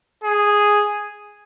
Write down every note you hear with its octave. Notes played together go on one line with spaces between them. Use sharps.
G#4